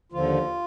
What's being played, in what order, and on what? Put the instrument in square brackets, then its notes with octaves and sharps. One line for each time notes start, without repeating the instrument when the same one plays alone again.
[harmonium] D#2 D3 F3 F4